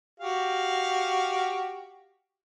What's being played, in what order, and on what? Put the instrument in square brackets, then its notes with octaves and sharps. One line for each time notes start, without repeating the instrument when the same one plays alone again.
[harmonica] F#4 G4 F5